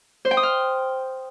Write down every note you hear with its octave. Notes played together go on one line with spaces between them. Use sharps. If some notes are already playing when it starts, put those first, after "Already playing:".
C5
G5
D#6
F6